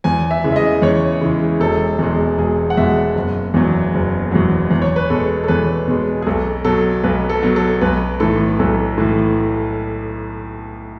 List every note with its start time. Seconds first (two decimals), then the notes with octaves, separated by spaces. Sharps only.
0.04 E2 G#5
0.31 E5
0.44 C#3 E3 G#3
0.52 E5
0.56 D#5
0.82 E2 C#5
1.21 C#3 E3 G#3
1.60 E1 A4
1.99 E2 B2 G#3
2.38 E1 G#4
2.70 F#5
2.77 E2 B2 G#3 E5
3.15 F#1
3.54 E2 B2 F#3
3.94 F#1
4.31 E2 B2 F#3
4.71 E2
4.82 C#5
4.96 B4
5.10 B2 G#3 A4
5.44 A4
5.48 E2 B4
5.88 B2 G#3
6.22 G#4
6.27 B1 A4
6.65 B2 F#3 A4
7.04 B1 B4
7.29 A4
7.43 B2 F#3
7.56 A4
7.81 B1 B4
8.20 A2 E3 A4
8.59 B1 A4
8.98 A2 E3